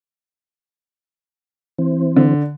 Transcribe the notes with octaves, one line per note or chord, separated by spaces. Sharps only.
E3 C4
D3